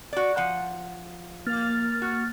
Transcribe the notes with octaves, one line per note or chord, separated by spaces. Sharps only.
F#4 D5
F3 F#5
A#3 F6 A6
F#4